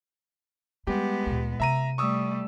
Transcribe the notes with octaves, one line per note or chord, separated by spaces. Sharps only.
G3 G#3 B3 G4
D2 A#2
C3 E5 A#5 D#7
G3 A3 C#6 D#6 E6